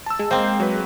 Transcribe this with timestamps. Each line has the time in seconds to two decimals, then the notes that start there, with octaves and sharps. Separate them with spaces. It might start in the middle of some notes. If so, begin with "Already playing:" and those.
0.06 A5 E6
0.19 G#3
0.31 A#3 C4 C5 D#5 G5
0.60 F#3 B4